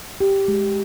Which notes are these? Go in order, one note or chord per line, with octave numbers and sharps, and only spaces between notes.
G4
G#3